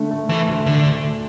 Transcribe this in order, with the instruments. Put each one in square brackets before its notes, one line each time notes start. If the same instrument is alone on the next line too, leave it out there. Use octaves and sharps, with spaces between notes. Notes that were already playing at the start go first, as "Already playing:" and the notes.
Already playing: [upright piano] D3 A3
A3
[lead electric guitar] E3 [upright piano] A3
[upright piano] D2
[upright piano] D2 [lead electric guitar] D3
[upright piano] D2
A3